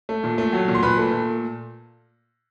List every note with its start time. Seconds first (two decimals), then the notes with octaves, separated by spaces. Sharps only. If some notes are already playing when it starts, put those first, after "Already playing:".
0.09 A3
0.24 A#2
0.38 A3
0.53 F#3
0.68 A#2
0.75 C6
0.83 A#2 B4 B5
0.97 A3
1.12 A#2